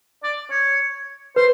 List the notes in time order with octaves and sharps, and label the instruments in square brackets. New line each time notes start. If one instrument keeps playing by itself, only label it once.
[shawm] D5
C#5
[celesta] B4 [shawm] C5